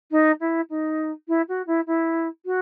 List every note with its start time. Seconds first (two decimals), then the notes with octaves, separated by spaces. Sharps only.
0.11 D#4
0.40 E4
0.69 D#4
1.28 E4
1.48 F#4
1.66 E4
1.86 E4
2.45 F#4